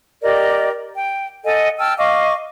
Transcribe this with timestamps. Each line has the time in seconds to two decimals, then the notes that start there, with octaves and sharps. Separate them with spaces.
0.22 G4 A#4 D5 D#5
0.97 G5
1.45 A4 D#5 F#5 G#5
1.78 G5 A5 E6 F6
1.99 D#5 F5 C#6 D6